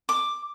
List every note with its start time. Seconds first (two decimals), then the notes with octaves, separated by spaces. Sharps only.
0.09 D6